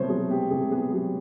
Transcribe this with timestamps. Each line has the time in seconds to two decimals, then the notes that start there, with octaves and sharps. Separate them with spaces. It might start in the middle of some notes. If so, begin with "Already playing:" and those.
Already playing: C2 B2 B3 C5 C#5
0.09 F#3 G#4
0.30 B3 G4
0.50 C2 G#4
0.71 B3 G#4
0.87 G#4
0.92 F#3 G4